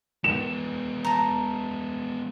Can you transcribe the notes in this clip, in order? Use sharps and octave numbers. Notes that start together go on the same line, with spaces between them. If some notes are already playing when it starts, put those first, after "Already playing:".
G#3 B3 E7
A5 A#5